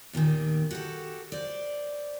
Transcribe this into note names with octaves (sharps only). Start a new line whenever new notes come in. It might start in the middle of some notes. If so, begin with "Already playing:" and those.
D#2 A#2 D3 D#3
F#4 G4 A4
C5 D5